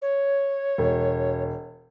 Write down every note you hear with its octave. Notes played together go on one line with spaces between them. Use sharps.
C#5
E1